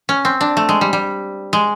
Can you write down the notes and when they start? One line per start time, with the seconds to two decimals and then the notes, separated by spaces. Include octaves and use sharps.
0.09 C#4
0.25 C4
0.41 D4
0.57 A3
0.69 G#3
0.81 G3
0.93 G3
1.53 G#3